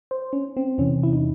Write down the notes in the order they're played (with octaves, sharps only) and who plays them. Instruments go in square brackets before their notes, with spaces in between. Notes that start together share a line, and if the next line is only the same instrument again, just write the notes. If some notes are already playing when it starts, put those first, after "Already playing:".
[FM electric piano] C5
C#4
C4
E2 C3 E3 C#4
E4
D#4